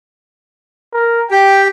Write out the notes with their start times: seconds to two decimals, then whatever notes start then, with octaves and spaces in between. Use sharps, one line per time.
0.94 A#4
1.31 G4 G5